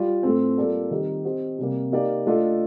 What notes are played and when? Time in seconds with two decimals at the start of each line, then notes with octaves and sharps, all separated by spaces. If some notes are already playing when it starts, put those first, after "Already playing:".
Already playing: G3 F4
0.23 A2 A3 C4
0.57 G3 A#3 F4 A4 D5
0.91 D#3 G3 C4 D#4 G4
1.25 C4 G4 C5 D#5
1.58 C3 G3 A#3
1.92 A#3 D#4 G4 D5 F5
2.26 A3 D4 F4 A4 D#5